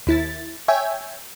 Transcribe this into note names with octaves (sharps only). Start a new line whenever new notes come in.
D#2 E4 A6
C#5 E5 G5 G#5